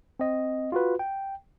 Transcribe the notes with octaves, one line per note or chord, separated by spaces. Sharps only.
C4 D#5
F4 F#4 B4
G5